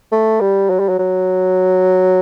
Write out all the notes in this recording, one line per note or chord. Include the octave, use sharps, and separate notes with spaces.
A3
G3
F#3
G3
F#3
F#3